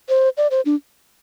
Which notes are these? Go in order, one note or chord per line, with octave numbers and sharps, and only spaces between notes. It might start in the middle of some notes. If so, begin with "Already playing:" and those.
C5
D5
C5
D4